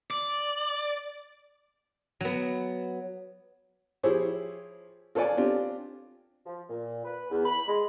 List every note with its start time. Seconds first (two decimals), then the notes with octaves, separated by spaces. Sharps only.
0.11 D5
2.21 F#3 B3
4.03 F3 E4 G4 G#4 C5 C#5
5.15 F4 A4 B4 C#5 D5 G#5
5.37 C4 D4 F4 G4
6.46 F3
6.69 A#2
7.05 B4
7.31 E2
7.46 B5
7.68 G#3